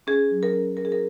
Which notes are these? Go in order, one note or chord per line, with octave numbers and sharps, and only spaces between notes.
C#4 G#4
F#3
A#4
C#4
C#4 A#4
G#4
A#4